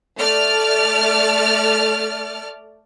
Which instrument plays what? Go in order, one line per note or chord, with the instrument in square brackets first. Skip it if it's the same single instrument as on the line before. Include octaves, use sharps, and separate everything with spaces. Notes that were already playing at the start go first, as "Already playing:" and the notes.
[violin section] A3 D5 F6